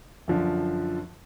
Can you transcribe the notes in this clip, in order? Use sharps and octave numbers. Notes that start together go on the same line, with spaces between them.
F#2 D3 F3